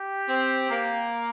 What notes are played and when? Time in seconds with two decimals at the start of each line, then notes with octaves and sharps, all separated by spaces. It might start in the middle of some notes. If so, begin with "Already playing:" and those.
Already playing: G4
0.27 C4
0.70 A#3